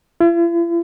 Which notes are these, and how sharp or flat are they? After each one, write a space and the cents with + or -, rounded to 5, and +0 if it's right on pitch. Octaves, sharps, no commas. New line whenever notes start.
E4 +45